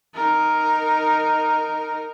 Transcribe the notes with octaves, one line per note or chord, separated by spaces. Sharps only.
D#4 A#4